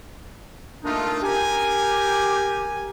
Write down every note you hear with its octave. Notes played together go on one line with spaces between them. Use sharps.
A3 A#3 D4 D#4 F4
G4 A#4 G#5